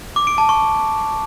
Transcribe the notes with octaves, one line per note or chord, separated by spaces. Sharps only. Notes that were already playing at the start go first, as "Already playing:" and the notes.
D6
D7
A5
C#6